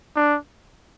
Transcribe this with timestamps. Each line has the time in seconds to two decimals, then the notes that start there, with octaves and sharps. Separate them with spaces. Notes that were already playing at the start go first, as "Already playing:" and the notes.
0.16 D4